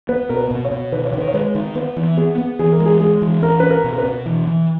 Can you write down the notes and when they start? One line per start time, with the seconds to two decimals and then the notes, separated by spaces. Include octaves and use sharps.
0.09 B3 B4
0.29 B2 A#4
0.37 B4
0.51 B2
0.65 C#5
0.71 B2
0.92 D#3 B4
1.05 C#5
1.14 D#3 B4
1.28 C#5
1.34 G#3 B4
1.55 D#3
1.75 B3 B4
1.96 E3
2.17 B3 G#4
2.38 B3
2.59 E3 G#4
2.72 A#4
2.80 G#3
2.86 G#4
3.00 G#3 G#4
3.22 E3
3.42 C#4 A#4
3.60 C#4 B4
3.71 A#4
3.84 B2
3.93 A#4
3.98 B4
4.05 B2
4.26 E3
4.47 E3